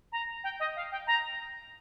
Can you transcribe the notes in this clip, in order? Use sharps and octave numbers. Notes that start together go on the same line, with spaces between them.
A#5
G5
D#5
F5
G5
A#5